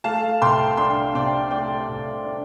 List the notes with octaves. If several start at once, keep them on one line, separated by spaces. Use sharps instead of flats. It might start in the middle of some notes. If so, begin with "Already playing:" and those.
A3 F5 A5
C2 G5 C6
D4 G5 C6
C3 D5 G5
A3 D5 G5
C2
D4